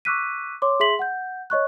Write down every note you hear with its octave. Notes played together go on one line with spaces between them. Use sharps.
C#6 D6 E6 F#6 B6 D#7
C#5 C6 D6
G#4 E5 C6 B6 F#7
F#5 G6
C#5 D#5 C#6 F#6